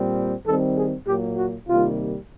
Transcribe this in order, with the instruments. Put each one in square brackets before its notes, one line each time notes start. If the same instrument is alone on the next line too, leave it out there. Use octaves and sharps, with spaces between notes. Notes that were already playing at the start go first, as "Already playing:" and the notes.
Already playing: [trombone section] A#2 G3 C4
D#3 G3 C4 A4
G#4
A#2 F#3 A#3 G4
F#4
C3 D#3 G3 A#3 F4